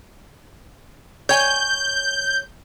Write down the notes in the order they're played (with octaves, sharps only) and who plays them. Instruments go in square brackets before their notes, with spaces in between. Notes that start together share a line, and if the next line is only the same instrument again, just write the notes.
[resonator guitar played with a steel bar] C#5 G#5 [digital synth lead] G6